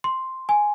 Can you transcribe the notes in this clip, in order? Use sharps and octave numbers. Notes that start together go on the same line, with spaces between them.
C6
G#5